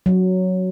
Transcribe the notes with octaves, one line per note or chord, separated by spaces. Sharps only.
F#3